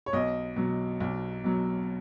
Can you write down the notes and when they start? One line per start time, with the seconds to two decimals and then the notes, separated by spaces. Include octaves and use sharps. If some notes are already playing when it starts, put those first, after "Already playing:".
0.06 C#5
0.13 B1 D#5
0.56 B2 F#3
1.00 B1
1.44 B2 F#3